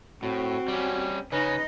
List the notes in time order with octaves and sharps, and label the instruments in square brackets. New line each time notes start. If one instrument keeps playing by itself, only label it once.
[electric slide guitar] A2 [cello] C4 [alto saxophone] F#4
[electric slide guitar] G3 C#4
[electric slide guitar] C#3 C#4 [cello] D#4 D#5 [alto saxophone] B4